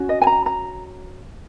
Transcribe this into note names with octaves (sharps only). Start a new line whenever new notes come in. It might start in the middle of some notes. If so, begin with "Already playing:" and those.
Already playing: C#4 F#4
D#5
G#5
A#5
A#5